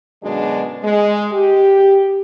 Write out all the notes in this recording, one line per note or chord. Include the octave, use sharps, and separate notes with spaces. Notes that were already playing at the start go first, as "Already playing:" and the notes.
F#2 B2 D3 G#3 D4
G#3
G4